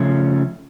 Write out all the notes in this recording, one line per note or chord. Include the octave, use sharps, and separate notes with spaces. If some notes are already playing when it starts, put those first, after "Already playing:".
Already playing: C#3 F3 A3 C#4